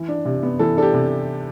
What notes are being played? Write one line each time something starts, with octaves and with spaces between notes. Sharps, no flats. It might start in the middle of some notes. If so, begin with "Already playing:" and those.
Already playing: E3
D4
C3
B3
E3 A4
D4 A4
G4
C3